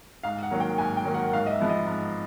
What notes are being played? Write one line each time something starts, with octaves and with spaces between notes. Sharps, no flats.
G#2 F5
F#5
D#3 F#3 A#3
G5
G#2 G#5
G5
D#3 F#3 A#3
F#5
G#2 F5
D#5
E5
F3 G#3 B3
D#5
G#2